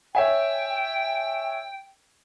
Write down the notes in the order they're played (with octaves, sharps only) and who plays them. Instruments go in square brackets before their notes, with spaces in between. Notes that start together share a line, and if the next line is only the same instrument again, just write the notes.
[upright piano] C#5 E5 G#5 [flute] G5